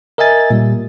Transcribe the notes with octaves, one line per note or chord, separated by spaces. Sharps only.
A#4 D#5 E5 G#5 A6
A#2 G3